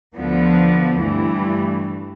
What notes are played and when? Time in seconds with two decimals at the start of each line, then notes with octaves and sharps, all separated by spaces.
0.16 D2 D3 F3 B3
1.01 G2 E3 A3